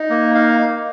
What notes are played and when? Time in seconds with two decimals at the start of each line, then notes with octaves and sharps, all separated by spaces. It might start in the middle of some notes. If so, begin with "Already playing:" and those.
Already playing: D#4
0.10 A#3
0.35 D#4 F5